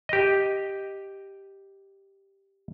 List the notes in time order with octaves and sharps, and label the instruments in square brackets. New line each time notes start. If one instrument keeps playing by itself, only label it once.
[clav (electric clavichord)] G4 D#5